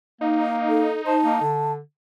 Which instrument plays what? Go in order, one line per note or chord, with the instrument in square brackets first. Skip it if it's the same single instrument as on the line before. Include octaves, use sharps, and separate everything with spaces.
[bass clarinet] A#3 [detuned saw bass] D#4
[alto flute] A4
[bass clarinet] C5 [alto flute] A5
[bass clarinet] A#3
D3